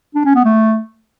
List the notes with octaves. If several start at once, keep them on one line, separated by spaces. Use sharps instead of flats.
D4
C#4
B3
A3